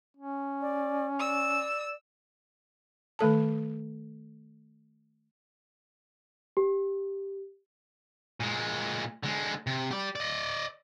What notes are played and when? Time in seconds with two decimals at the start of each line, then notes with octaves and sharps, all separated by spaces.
0.17 C#4
0.61 D5
1.20 D5 E6
3.19 D#3 A3 A4 A5
6.57 G4
8.40 A#2 G#3
9.23 D3 G#3
9.67 C3
9.91 G4 D5
10.16 D5 D#5